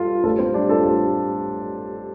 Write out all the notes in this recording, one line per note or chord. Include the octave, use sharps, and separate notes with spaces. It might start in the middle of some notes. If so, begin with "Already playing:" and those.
Already playing: G3 F4 A4
A1 F4 A4
C4
G3 D4
F4 A4
A1